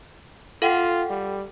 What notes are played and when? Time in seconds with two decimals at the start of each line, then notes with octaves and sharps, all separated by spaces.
0.62 F4 A4 F#5 G5
1.10 G3